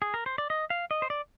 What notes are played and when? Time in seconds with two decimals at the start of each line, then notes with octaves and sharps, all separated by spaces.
0.02 G#4
0.14 A#4
0.26 C5
0.38 D5
0.50 D#5
0.70 F5
0.91 D#5
1.02 C5
1.10 D5